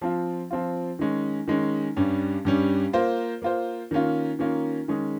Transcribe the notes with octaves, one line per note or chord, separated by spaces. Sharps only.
F3 C4 F4
F3 C4 F4
D#3 G#3 C#4
D#3 G#3 C#4
G2 G3 C#4
G2 G3 C#4
A#3 F4 C5
A#3 F4 C5
D#3 A#3 C#4 F4
D#3 A#3 C#4 F4
D#3 G#3 C#4 G#4